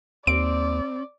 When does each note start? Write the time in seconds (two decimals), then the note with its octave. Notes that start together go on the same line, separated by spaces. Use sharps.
0.27 D#2 C4 D5 D7